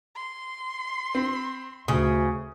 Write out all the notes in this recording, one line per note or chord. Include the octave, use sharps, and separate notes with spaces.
C6
C4
D2 C#3 D#6